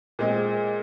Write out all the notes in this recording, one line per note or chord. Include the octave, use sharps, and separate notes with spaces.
A#2 G#3 C4